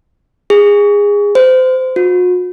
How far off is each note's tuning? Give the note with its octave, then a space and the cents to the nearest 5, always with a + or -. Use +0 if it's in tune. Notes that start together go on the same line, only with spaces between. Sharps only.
G#4 -20
C5 -25
F#4 -45